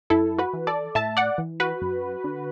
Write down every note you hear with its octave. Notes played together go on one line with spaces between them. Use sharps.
F#2 E4 A4
F#4 B4
E3
A4 D5
A2 E5 A5
D5 F#5
E3
F#4 B4
F#2
D3